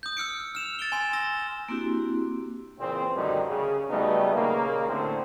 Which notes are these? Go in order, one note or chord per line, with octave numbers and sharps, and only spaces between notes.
D#6 G6
E6 F6 C#7 D7
F6 E7 F7
A6 D7 G7
G#5 C6 E7
E6 A#6 G7
A#3 C4 D4 E4 F#4 G4
A#2 C#3 E3 C4
F#2 A2 D3 D#3 F#3 G3
C#3
C#3 F#3 G3 A3 B3 D#4
D#2 A#2 C#3 A#3
A2 D3 C4